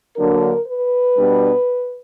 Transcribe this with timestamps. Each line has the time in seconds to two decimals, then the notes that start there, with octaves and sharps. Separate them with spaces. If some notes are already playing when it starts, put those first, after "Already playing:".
0.17 D3 F#3 A#3 D4 A#4
0.67 B4
1.16 B2 G3 B3 D4